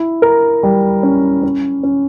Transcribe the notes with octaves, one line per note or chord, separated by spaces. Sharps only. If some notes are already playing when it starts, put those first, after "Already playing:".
Already playing: E4
A#4
G3
C#4
C#4
C#4